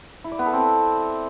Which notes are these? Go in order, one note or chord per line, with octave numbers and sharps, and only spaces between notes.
E4
D5
B3
A4
C4